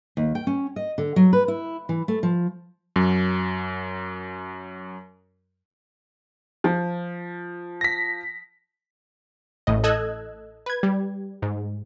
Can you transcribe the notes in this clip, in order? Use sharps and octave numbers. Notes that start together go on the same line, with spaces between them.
D#2
G5
C#4
D#5
D3
F#3
B4
E4
E3
A3
F3
F#2 F#3
F3
A#6 B6
A1 A2 D#5
A4 D#5 E6 F#6 G#6
B4 G#6
G3
G#2